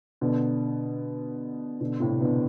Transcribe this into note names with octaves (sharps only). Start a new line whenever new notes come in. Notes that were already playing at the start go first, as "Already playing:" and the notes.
B2 D3
B2 D3
A2 C3
B2 D3